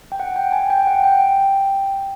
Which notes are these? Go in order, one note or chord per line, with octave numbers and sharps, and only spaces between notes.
G5
F#5
G5
G#5
G5
F#5
G5